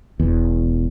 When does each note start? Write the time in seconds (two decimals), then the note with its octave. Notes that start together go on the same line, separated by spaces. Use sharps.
0.20 E1 E2